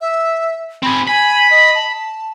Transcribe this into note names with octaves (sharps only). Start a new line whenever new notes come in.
E5
C4 G#4 B5
G#5 B5
D#5
A5